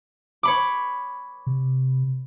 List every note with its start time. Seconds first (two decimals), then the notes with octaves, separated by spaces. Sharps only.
0.43 C#5 B5 D6
1.47 C3